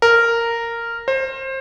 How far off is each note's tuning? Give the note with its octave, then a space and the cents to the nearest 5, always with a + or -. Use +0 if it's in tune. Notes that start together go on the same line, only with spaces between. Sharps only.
A#4 -10
C5 +25